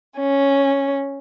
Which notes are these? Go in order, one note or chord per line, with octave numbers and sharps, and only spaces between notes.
C#4